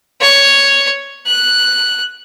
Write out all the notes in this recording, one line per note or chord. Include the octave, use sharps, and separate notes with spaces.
C#5
F#6